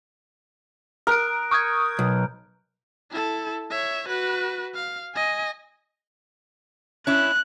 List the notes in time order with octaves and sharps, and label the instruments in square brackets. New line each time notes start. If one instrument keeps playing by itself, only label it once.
[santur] A#4 [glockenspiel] D#6 F#6 D7
[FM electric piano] C#6 D#6 G#6 [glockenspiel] F6 G6
[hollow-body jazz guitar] B1
[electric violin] E4 A4
C#5 E5
F#4 B4
F5
D#5 G#5
[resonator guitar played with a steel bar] C#4 E4 [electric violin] F#6